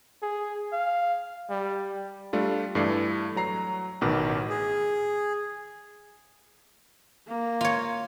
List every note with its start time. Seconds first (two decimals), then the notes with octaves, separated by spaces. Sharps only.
0.22 G#4
0.73 F5
1.50 G3
2.33 G3 A3 D4 F4
2.75 G2 E3 A3 D5 C7
3.36 F#3 A#5 C7
4.01 A1 B2 D#3 B4 D6
4.50 G#4
7.27 A#3
7.61 F4 C#5